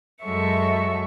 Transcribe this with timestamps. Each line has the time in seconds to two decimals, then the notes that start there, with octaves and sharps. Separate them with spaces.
0.24 F#2 F#3 G#3 A4 E5 C#6